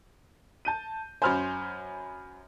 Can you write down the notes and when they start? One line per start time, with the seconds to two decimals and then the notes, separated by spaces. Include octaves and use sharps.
0.65 A5 G6 D#7
1.22 F#2 C5 G#5 B5 F6